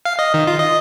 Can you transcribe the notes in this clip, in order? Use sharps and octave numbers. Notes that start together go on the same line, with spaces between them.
F5
D#5
D#3
F4
D#5